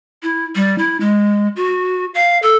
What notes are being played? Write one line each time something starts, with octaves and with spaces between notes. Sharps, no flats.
E4
G3
E4
G#3
F#4
F5
A4